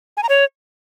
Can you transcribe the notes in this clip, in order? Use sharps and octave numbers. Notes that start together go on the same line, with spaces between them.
G#5
A#5
C#5